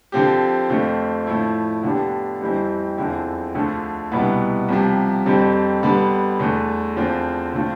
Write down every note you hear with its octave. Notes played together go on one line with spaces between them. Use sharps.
D3 F3 C4 G4
F2 D3 A3 C4 F4
A2 F3 A3 E4
D3 F3 B3 D4 G4
F2 E3 G3 C4 E4
E2 D3 F3 C4 E4
D2 D3 F3 A3 D4
C2 B2 B3 E4
C2 C3 F3
F2 D3 G3 C4
D3 G3 B3
E2 D3 A3
E2 D3 F3 C4 F4
D3 A3 C4 F4